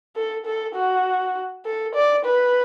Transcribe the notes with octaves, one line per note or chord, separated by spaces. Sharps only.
A4
A4
F#4
A4
D5
B4